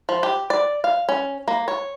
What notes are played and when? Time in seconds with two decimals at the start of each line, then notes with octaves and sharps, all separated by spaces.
0.09 F3
0.23 G4
0.50 D5
0.84 F5
1.09 C#4
1.48 A#3
1.68 C#5